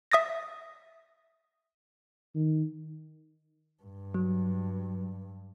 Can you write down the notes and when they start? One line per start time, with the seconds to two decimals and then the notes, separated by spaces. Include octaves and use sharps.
0.12 E5 D#6 A6 A#6
2.35 D#3
3.83 G2
4.14 F#3